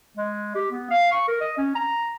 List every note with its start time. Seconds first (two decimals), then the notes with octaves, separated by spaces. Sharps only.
0.17 G#3
0.55 G4
0.71 B3
0.90 F5
1.12 C#6
1.28 A#4
1.41 D#5
1.57 C#4
1.75 A#5